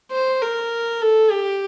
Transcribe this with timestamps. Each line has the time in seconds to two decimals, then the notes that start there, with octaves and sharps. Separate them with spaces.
0.12 C5
0.42 A#4
1.02 A4
1.32 G4